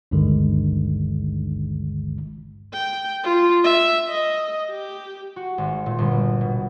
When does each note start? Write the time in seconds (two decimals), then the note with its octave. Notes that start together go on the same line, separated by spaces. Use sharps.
0.11 G#1 D2 G2 D3 D#3 G#3
2.73 G5
3.24 F4
3.64 E5
4.08 D#5
4.71 G4
5.36 F#4
5.58 G#1
5.86 A#2
5.98 G1
6.12 G3
6.41 B2